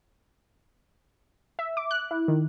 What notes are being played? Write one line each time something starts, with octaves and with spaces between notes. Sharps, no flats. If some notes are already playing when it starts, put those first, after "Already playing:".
E5
D6
F#6
E4
D#3